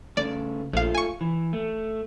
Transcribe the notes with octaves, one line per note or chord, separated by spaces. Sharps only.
C#3 A3 D5
A#1 A3 F4 F5
G#5 C#6
E3
A3